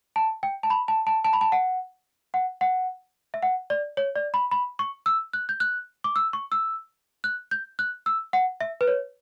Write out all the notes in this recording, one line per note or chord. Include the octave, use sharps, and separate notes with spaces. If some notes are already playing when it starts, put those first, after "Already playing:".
A5
G5
A5
B5
A5
A5
A5
B5
A5
F#5
F#5
F#5
E5
F#5
D5
C#5
D5
B5
B5
C#6
E6
F#6
G6
F#6
D6
E6
C#6
E6
F#6
G6
F#6
E6
F#5
E5
B4
C#5